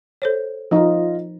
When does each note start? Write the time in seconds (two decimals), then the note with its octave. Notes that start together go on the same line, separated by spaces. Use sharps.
0.22 A4 C5 C#5
0.71 F3 D#4 F4 D#5